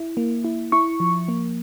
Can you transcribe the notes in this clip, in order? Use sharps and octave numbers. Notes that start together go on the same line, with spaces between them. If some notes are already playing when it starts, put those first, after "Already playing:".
Already playing: E4
A#3
E4
E4 C#6
F3
A#3